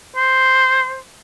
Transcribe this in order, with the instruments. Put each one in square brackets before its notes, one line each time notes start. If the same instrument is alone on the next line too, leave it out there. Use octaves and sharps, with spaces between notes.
[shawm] C5